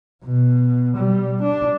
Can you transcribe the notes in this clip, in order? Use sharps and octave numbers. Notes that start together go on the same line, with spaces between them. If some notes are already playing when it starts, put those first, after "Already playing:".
B2
G3
D4